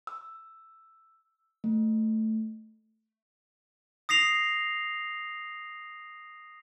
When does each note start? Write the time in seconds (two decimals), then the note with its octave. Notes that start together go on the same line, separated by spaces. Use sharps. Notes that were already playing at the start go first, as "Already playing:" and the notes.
0.07 E6
1.64 A3
4.09 D#6 A#6 C7 F7